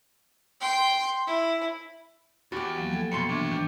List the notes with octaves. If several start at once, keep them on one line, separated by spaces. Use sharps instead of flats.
G5 C6
E4
E2 F#4 G4 A6
F3 F#3 A#3
A4 G5
C2 F2 B2 C6 C#7
E3 D4 G4 C#5
G#2 D#3 D4